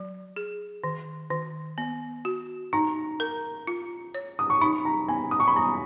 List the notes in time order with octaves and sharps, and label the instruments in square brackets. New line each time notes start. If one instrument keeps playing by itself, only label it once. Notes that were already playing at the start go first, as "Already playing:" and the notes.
Already playing: [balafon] F#3
G#4
D#3
D#3
B3
F#4
[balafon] D#4 [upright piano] A#5
[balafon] A#4
F4
C#5
[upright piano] D#6
C#6
[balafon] D#4 [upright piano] B5
[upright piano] A#5
[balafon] B3 [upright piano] G#5
[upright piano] D#6
C#6
B5
[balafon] B3 [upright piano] A#5